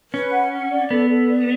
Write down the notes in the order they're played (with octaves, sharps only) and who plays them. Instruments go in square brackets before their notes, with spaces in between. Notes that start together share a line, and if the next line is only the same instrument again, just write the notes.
[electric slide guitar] C#4 [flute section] B4
[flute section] F#5
F#5
D5
[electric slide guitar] B3 [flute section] A4
[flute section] A4
D5